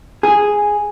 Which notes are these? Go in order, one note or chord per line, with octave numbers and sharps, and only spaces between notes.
G#4